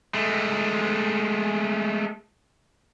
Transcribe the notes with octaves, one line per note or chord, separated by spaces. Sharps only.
G#3 A3